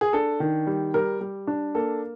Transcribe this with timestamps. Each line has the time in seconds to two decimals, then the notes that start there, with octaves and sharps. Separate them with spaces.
0.01 G#4
0.13 D4 A4
0.40 D#3
0.67 G3
0.94 G3 A#4
1.21 G3
1.47 D4
1.75 A#3 A4